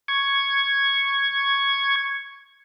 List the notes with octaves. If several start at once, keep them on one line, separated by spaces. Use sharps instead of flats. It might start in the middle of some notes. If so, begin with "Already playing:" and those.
C#6 G#6